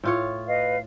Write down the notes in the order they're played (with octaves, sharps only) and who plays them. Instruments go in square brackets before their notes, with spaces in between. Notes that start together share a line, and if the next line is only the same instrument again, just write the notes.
[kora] A2 F4 C#5
[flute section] B4 D#5 F5